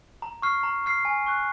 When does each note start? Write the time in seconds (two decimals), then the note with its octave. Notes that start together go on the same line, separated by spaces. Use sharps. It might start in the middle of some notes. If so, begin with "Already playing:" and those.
0.22 A#5
0.42 C#6 F6 C7
0.63 A#5
0.84 C#6 F6 C7
1.05 G#5
1.26 C#6 F#6